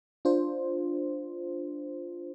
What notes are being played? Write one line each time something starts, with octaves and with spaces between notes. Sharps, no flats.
D4 F4 C5